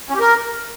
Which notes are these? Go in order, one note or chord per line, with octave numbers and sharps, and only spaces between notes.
C#4
G4
A#4